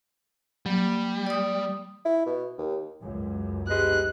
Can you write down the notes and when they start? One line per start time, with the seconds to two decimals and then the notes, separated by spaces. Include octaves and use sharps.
0.66 F#3 G3 A#3
1.27 D5 D#6
2.05 E4
2.26 B2
2.58 D#2
3.01 C#2 F#2
3.68 B2 G3 G#3 F#6